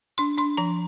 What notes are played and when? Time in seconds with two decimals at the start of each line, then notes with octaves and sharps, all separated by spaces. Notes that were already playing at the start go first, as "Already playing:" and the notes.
0.18 D4 C6
0.38 D4 C6
0.57 F3 A#5